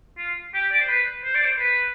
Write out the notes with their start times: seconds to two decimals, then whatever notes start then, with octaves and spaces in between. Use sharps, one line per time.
0.18 F4
0.54 G4
0.71 D5
0.80 C5
0.88 B4
1.24 C5
1.34 D5
1.45 C5
1.59 B4